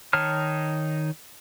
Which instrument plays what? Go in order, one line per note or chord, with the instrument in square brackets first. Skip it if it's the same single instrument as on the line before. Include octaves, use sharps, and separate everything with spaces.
[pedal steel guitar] D#3 D#4 C#5 A5 F6